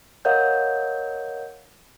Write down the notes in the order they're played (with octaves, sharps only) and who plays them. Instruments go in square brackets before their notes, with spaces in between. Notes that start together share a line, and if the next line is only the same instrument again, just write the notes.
[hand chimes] A#4 C#5 D#5 F5 F#5 G6